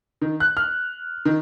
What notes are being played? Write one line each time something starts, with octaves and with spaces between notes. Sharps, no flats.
D#3
F#6
F6
D#3